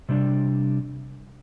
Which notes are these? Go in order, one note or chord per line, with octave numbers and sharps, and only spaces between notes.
C3 G3 D4